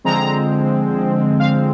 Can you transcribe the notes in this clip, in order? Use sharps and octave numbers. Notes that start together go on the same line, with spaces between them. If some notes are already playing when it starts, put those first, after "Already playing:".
D3 F3 G#3 C4 A#5
F5